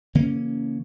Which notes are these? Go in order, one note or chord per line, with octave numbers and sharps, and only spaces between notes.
C#3 E3 A#3 C#4